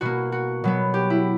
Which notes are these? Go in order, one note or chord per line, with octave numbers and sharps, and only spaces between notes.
B2 A#3 F#4
F#4
B2 F#3 B3
G4
E4